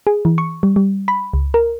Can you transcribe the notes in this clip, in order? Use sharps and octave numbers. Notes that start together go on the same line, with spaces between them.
G#4
E3
C#6
G3
G3
B5
C#2
A#4